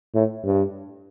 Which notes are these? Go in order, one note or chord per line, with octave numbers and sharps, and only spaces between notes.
A2
G2